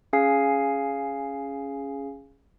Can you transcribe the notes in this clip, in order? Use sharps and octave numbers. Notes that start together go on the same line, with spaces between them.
C#4 G#4 F5 G#5 C7